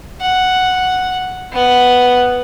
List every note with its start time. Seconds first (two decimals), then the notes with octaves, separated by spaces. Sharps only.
0.21 F#5
1.52 B3 F#5